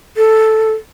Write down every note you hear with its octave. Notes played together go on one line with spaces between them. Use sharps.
A4